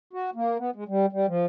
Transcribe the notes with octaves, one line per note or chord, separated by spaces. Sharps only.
F#4
A#3
B3
G#3
G3
G3
F3